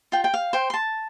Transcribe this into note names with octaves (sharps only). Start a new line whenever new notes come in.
F4 G5
G5
F5
C5 G5
C6
A5